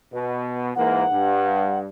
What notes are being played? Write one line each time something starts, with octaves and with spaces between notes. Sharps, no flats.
B2
G#2 E3 A#3 F#5
G2